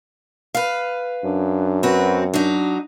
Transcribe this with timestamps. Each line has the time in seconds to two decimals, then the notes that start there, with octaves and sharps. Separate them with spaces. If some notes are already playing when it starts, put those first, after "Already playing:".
0.54 B4 F5
1.24 F#2 D4
1.83 C4 F#4 B4
2.34 F#3 D4 D#4